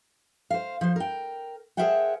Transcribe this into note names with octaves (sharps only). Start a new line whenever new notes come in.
C5 F5
F3 C5
A#4 G5
G#4 A#4 C5 E5 F#5 G5